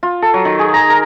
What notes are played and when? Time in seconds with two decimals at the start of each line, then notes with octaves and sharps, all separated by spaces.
0.03 F4
0.22 A4
0.34 F#3
0.45 D#3
0.59 G#4
0.74 A#5
0.90 A#4